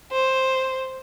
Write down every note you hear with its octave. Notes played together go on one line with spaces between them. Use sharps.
C5